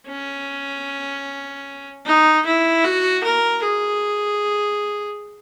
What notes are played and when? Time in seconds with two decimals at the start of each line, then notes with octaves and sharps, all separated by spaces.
0.08 C#4
2.05 D#4
2.45 E4
2.84 F#4
3.23 A#4
3.63 G#4